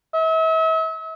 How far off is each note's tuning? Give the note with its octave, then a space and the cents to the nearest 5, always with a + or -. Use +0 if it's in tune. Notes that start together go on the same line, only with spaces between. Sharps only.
E5 -40